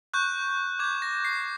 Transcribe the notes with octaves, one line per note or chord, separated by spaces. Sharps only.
C#6 F#6 G6
D6 G6 G#6
A#6
C7